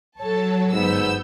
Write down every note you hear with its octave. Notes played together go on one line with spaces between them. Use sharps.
F#3 A4 C#5 A5
G1 G#2 B3 E6 G6